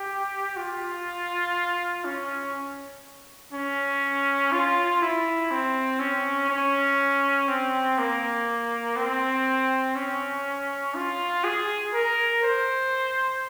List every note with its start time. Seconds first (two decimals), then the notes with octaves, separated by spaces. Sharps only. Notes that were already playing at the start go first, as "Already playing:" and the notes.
Already playing: G4
0.57 F4
2.05 C#4
3.53 C#4
4.52 F4
5.02 E4
5.51 C4
6.00 C#4
6.49 C#4
7.48 C4
7.98 A#3
8.96 C4
9.96 C#4
10.95 F4
11.44 G#4
11.93 A#4
12.43 C5